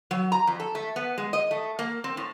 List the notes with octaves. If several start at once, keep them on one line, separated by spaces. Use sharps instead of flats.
F#3
A#5
F2
A4
A3
B3
G#3
D#5
A3
A#3
C4
A2